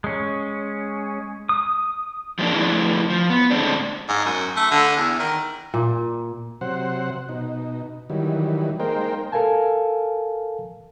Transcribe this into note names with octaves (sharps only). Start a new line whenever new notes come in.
G#3 C#4
D#6
F3 G#3 A#3 D4 D#4
F3 A3 E4 G#4 B4
F3
B3
A2 D3 F3 G#3 C4 D4
G#2
F#2
A3
D3
E2
D#3
A#2
C3 F#3 C5 F#5
B2 D#4
D#3 E3 F#3 G3
G#3 A#3 D#4 A#4 C5 G5
A4 A#4 F5 G#5 A5